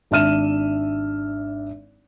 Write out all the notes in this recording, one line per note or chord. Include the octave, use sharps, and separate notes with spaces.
G#1 D4 E5 F6 D#7 E7